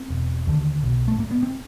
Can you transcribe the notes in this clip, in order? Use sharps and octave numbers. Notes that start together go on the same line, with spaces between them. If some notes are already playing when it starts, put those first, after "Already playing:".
Already playing: C4
E1
D#2 D3
B1
A3
A2 A#3
B3
C4